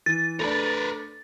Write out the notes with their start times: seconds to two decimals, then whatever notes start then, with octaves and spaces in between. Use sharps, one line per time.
0.06 E3 A6
0.40 A3 D4 A#4 B4